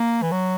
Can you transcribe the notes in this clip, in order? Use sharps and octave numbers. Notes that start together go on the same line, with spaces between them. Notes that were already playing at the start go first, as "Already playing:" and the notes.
Already playing: A#3
E3
F#3